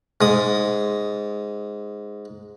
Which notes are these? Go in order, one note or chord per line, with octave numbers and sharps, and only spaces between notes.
G#2 D#6